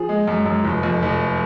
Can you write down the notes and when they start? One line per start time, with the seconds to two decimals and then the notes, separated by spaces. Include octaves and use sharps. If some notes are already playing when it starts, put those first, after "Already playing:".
Already playing: F3 G#4
0.09 G#3
0.27 F#2
0.46 F#2
0.64 F1
0.83 F2
1.02 F1